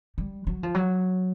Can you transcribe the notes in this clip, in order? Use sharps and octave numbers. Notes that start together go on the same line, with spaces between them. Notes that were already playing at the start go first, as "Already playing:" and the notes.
G3
F#3
F3
F#3